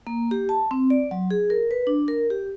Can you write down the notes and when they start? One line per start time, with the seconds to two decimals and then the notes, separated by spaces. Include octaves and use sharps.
0.07 A#3
0.31 G4
0.49 A5
0.71 C4
0.90 D5
1.11 F#3
1.31 G#4
1.50 A#4
1.71 B4
1.87 D4
2.08 A#4
2.30 G4